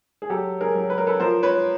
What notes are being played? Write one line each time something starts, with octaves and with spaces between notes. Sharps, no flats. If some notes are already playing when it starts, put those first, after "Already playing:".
G#4
F#3 G4 A4
G#4 A#4
F#3
B4
A#4
A4 B4
F3 A#4 C5
B4 C#5